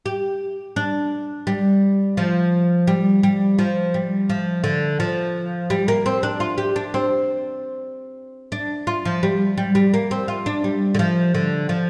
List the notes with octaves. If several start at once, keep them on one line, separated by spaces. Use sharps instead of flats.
G4
D4
G3
F3
G3
G3
F3
G3
F3
D3
F3
G3
A#3
C4
D4
F4
G4
D4
C4
D4
F4
F3
G3
G3
G3
A#3
C4
F4
D4
G3
D3
F3
D3
F3